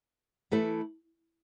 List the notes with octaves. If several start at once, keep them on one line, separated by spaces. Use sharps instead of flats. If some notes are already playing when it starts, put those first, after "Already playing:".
E3 A3 E4 A4